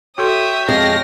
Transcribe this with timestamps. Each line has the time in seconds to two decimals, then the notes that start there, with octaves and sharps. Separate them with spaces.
0.18 F#4 A4 C#5 E5 G5 C6 D#6
0.69 F2 G#3 A5 F6 A#6